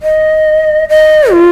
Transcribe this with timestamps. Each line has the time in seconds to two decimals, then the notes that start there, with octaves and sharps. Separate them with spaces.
0.02 D#5
0.89 D#5
1.31 F4